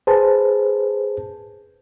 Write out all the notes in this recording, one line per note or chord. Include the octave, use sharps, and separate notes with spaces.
G#4 B4 C5 A5